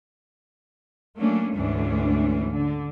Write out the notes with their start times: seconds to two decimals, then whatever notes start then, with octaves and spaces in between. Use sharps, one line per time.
1.18 F#3 A3 A#3 C#4 D4
1.56 D2 G#2 E3 C#4 D4
2.52 D3